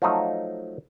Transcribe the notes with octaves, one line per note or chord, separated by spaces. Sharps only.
F3 F#3 A3 D#4